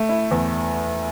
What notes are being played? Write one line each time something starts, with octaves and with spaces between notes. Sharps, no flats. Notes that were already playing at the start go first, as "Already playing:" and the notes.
Already playing: A3
E4
E2